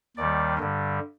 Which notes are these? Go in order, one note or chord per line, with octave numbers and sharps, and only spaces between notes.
D#2 D#3 G3 D5
G2 D3 G3